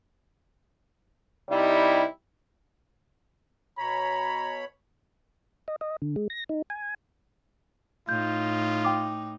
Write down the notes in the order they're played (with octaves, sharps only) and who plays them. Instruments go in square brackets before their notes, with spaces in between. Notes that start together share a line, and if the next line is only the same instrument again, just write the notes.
[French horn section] C3 G3 D#4 E4
[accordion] B2 C#5 B5 [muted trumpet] A#5
[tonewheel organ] D#5
D#5
D3
G#3
A#6
D#4
G#5
[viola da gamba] A2 D#4 [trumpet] F4 [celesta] G6
[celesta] G5 D6